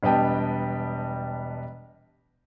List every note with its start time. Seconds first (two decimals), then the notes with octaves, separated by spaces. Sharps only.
0.03 E1 G3 B3 D#5 G5 A5